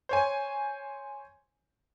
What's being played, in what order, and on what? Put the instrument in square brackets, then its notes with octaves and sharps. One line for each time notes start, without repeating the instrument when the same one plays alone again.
[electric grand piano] C5 C#5 G#5